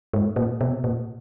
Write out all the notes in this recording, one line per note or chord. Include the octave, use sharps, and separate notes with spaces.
G#2
A#2
B2
A#2